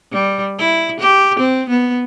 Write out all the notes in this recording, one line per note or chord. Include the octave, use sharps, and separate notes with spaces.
G3
E4
G4
C4
B3